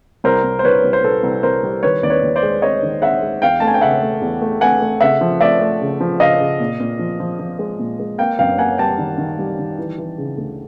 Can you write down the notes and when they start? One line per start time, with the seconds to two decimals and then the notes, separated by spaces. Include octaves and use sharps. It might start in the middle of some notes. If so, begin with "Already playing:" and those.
0.24 C2 A#4 C5
0.44 C2
0.59 C5
0.64 C2 B4 C#5
0.84 C2
0.93 C5
1.04 C2 A4 B4
1.23 C2
1.43 C2 A#4 C5
1.63 G3
1.83 D#3 B4 C#5
2.03 D#2 D5
2.10 B4 C#5
2.23 D#2
2.36 C5 D5
2.43 G#3
2.62 G#3 C#5 D#5
2.82 D#3
3.02 G#3 E5 F#5
3.22 G#3
3.42 E2 F5 G5
3.60 A3 A5
3.67 G#5
3.74 G5
3.81 C#3 E5 F#5
4.02 A3
4.21 E2
4.42 A3
4.61 A3 F#5 G#5
4.82 A3
5.01 C#3 E5 F#5
5.21 F3
5.41 A3 D5 E5
5.61 A3
5.81 C#3
6.00 F3
6.20 C#3 D#5 F5
6.40 C#3
6.60 A#2
6.80 A#2
6.99 F3
7.20 F3
7.39 F3
7.59 G#3
7.79 A#2
8.00 G#3
8.18 A#3 F5 G5
8.39 F#2 F5 G5
8.58 A#3 F#5 G#5
8.78 G3 G5 A5
8.98 D#3
9.18 D#3
9.39 G3
9.59 D#3
9.79 E3
9.98 E3
10.18 C#3
10.38 D2